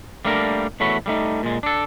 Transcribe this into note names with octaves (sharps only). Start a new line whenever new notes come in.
G3 A3 A#3 D4 A#4
E2 A3 F#4 C#5 B5
G3 A3 D#4
A#2 G#3
D4 A4